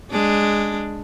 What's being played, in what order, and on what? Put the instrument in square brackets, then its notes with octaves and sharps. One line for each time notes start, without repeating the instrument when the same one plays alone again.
[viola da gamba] G#3 D4